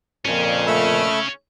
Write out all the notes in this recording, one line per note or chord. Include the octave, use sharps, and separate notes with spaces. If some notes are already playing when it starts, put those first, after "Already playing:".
F2 A#2 C#4 G#4
A3 B5 E6